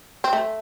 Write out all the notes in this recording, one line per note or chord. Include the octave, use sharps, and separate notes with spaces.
C4
A3